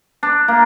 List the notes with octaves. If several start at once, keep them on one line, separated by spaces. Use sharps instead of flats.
D4
A#3